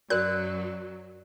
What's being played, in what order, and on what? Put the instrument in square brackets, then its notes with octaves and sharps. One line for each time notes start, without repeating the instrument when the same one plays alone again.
[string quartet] F#2 F#3 [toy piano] F#4 A#4 D5 [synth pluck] F#6